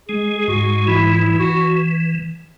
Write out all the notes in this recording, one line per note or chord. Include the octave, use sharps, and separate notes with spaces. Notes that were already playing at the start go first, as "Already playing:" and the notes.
G#3 G#4
G#4
G#2 F#4
E3 E4
E4
E3
F#4